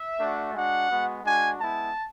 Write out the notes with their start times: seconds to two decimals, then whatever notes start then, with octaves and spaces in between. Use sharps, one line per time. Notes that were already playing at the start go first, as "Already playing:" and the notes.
Already playing: E5
0.19 A3 D4 F#4
0.54 G#3 D4 F#4 F#5
0.89 G#3 B3 F#4
1.23 G#3 D4 F#4 G#5
1.58 G#3 B3 E4 A5